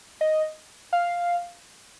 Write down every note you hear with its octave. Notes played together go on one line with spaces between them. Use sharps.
D#5
F5